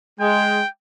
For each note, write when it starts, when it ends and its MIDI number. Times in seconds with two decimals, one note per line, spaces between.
0.20 0.60 56
0.20 0.69 79